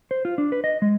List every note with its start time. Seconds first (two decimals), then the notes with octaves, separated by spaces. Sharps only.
0.11 C5
0.25 F4
0.38 D4
0.52 B4
0.64 D#5
0.82 G#3